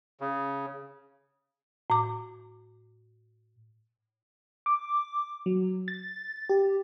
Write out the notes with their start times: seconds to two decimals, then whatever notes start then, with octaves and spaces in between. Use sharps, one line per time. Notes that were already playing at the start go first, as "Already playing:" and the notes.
0.20 C#3
1.90 A2 D6
4.66 D6
5.46 F#3
5.88 A6
6.49 G4